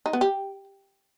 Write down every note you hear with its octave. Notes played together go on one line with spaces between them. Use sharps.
D#4
B3
G4